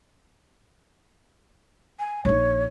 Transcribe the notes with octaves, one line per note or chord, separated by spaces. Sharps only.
G#5
A#1 D#4 C#5